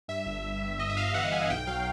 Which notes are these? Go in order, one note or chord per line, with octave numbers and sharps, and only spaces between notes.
G2 E5
G1
G1
G2
G1 D#5
E5
G2 F5
E3 F#5
G1 G#5
B1 G5
F#3 F5